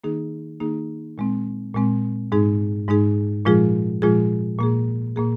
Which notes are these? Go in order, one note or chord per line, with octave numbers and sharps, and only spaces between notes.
D#3 A#3 D#4 G#4
D#3 A#3 D#4 G#4
A#2 G#3 C4
A#2 G#3 C4
G#2 G#3 D#4 G#4
G#2 G#3 D#4 G#4
A#2 F3 G#3 F4 G#4
A#2 F3 G#3 F4 G#4
A#2 A#3 G#4
A#2 A#3 G#4